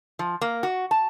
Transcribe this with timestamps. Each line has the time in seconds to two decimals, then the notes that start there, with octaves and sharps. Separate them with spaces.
0.19 F3
0.41 A#3
0.63 F#4
0.91 A5